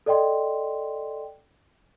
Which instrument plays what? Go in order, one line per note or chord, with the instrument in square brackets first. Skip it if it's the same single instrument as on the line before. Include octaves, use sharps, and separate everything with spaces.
[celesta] A4 D5 D#5 G5 C6